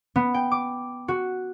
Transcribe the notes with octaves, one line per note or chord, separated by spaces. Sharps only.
B3
G5
D6
F#4